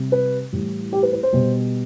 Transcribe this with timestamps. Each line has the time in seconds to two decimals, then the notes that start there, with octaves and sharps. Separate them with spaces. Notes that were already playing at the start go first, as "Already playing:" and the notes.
Already playing: C3 G3
0.12 B4
0.52 A2 E3 G3
0.93 G4
1.03 B4
1.13 B4
1.23 C5
1.32 B2 G3